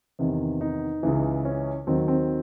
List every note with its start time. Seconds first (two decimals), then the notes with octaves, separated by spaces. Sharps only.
0.19 E2 C3 D#3
0.61 D#4
1.03 C#2 C#3 E3
1.45 C#4
1.87 D#2 D#3 F#3 C4
2.08 C4